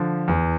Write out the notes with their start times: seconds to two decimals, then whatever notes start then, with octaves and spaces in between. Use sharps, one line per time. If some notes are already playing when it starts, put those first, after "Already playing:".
Already playing: D3 F3
0.28 E2 E3